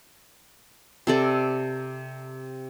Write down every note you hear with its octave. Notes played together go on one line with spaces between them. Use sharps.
C3 A4 D5